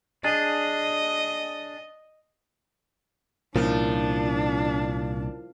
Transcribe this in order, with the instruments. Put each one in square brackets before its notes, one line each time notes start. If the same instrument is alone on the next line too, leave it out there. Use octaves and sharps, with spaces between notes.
[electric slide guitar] D4 G#4 [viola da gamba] D#5
[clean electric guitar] C2 A#2 [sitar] F3 [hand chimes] C#4 E4 A#4 [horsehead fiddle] D4